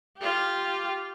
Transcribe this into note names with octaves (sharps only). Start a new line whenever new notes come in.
F4 G4